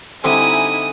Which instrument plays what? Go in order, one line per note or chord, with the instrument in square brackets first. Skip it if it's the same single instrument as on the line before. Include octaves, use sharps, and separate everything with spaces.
[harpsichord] D3 G3 C4 [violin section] D#4 E4 G#5 [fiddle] D#6